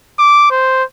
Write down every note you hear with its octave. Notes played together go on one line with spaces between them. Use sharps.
D6
C5